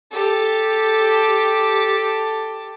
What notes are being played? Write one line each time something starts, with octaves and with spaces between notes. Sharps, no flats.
G4 A4